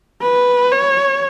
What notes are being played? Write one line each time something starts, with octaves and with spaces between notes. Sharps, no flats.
B4
C#5